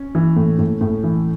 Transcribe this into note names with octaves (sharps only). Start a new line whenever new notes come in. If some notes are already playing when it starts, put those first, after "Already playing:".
Already playing: C#4
E3
A2
A2
A2
E3